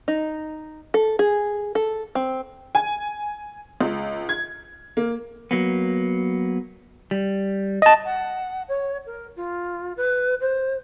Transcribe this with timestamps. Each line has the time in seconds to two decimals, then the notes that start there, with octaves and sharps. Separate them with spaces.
0.08 D#4
0.94 A4
1.19 G#4
1.75 A4
2.15 C4
2.75 G#5
3.81 C#2
4.29 G#6
4.97 A#3
5.51 F#3 A#3 B3
7.11 G3
7.82 D#5 A5
8.05 F#5
8.68 C#5
9.06 A#4
9.36 F4
9.97 B4
10.40 C5